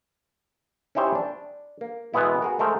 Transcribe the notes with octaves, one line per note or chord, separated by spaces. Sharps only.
C#4 D#4 E4 G4 C5 C#5
D4
A#3
B2 E3 G#3 B3 E4
F#4 G#4 A#4
G#3 A3 A#4 C5